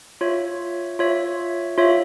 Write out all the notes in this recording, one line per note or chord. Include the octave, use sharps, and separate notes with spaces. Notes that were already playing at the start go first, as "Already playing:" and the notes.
F4 C#5 E5
F4 C#5 E5
F4 C#5 E5